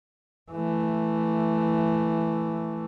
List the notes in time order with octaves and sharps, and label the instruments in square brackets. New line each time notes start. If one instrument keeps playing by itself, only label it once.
[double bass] E3 A3